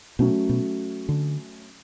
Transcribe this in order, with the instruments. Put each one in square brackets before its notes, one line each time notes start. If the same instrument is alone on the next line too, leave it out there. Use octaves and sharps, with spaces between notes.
[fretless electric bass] B2 [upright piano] F#3 A3 C#4
[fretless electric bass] B2
D3